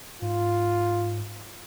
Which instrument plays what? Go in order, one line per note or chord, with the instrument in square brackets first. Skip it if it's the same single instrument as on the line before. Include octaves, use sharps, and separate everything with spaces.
[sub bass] G#2 [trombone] F4